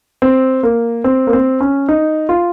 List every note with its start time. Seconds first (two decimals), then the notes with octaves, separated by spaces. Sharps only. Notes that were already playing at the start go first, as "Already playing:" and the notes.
0.22 C4
0.63 A#3
1.04 C4
1.27 A#3
1.33 C4
1.61 C#4
1.89 D#4
2.29 F4